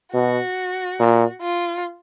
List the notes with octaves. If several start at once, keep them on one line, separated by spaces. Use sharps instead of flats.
B2 F#4
A#2
F4